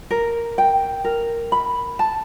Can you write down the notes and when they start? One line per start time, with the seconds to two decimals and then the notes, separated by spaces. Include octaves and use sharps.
0.11 A#4
0.58 G5
1.04 A#4
1.52 B5
1.99 A5